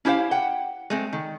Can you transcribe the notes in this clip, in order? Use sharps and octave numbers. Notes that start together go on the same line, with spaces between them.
C#4 E4 G4 C5 F5
F#5 G5
G#3 A3 C4
D#3